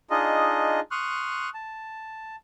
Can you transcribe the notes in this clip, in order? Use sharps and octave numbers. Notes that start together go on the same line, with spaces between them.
D4 D#4 F4 G#4 D#5
C6 C#6 D#6 F6 F#6
A5